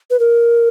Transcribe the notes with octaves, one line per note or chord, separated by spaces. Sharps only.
B4
A#4